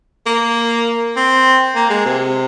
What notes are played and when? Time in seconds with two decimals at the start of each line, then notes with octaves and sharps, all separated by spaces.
0.26 A#3
1.16 C4
1.75 A#3
1.90 G#3
2.06 C3